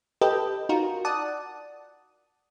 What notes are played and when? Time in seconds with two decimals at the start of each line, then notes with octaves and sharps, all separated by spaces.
0.21 G4 A4 B4 D#5 G5
0.69 D#4 F4 F#4 A#4
1.05 D5 F#5 A5 D#6